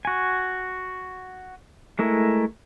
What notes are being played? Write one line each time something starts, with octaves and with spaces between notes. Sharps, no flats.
F#4 G#5
G#3 A3 E4 A#4